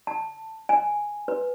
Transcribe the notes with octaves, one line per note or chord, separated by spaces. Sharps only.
A5
G#5
B4